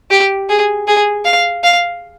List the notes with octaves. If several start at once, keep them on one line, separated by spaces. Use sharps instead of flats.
G4
G#4
G#4
F5
F5